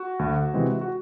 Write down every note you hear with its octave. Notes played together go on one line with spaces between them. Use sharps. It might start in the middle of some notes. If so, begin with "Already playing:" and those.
Already playing: F#4
D2
C3 E3 G#3 C4
F#4